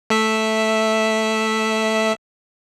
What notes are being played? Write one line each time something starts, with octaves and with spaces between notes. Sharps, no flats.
A3 E5